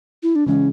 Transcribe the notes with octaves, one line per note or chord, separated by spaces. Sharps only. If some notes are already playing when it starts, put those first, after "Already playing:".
E4
D4
C#3 E3 G#3 C#4